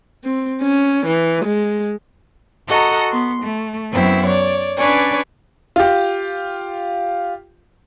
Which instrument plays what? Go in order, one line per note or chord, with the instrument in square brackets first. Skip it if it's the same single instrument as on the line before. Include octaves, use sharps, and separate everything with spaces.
[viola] C4
C#4
E3
G#3
[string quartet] F#4 A4 D#5 F#5 A#5
B3 C6
A3
F#2 F#3 B3 C4 E4
C#5 D5
C#4 D4 B4 C#5 D5 G#5
[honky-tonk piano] F4 G4